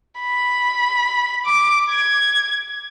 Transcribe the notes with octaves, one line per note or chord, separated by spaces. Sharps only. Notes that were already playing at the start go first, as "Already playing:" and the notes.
B5
D6
G#6